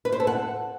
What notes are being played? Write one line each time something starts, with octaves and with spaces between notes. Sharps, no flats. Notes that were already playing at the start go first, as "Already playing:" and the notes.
B4
C5
A4
F#5